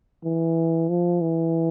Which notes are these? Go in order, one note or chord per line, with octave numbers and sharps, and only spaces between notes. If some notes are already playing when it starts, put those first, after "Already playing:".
E3
F3
E3